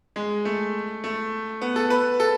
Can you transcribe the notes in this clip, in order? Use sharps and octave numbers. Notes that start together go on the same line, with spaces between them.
G#3
A3
A3
B3
A4
B4
A4